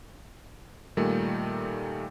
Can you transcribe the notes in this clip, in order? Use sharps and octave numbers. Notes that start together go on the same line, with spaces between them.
A#2 D#3 G3 A3